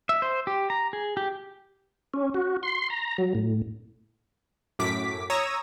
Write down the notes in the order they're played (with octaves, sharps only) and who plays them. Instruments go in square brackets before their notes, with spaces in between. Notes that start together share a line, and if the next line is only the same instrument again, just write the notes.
[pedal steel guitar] E5
C5
G4
A#5
G#4
G4
[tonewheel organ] C#4
F#4
C6
A#5
F#3
A2
[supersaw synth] F#2 A2 D6 B6
C#5 A#5 D#6 E6 G#6 A#6